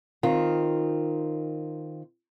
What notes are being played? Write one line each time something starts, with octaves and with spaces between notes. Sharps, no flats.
D#3 C4 F4